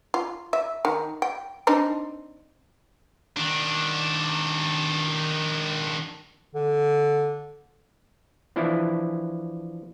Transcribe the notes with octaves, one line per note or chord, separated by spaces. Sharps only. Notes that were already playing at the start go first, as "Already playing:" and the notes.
F4
E5
D#3
G5
C4 D4 D#4
D#3 D4
D3
E3 F3 D4 E4